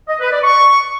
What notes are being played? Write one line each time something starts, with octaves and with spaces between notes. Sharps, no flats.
D#5
B4
D5
C#6